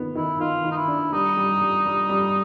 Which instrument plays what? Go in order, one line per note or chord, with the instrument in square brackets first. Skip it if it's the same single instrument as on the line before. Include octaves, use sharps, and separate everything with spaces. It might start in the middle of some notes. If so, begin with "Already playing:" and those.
Already playing: [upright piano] D#3 B3
[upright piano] D#3 [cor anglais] E4
[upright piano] D#3 [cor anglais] F4
[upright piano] D#3
[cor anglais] D#4
E4
[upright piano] D4
[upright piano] G3 [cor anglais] D#4
[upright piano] G3
G3
G3
G3